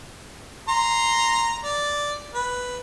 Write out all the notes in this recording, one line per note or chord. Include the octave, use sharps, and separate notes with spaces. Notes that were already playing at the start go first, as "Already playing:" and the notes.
A#5 C6
D5
B4